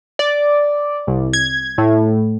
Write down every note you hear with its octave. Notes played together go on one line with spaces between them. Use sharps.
D5
C2
G#6
A2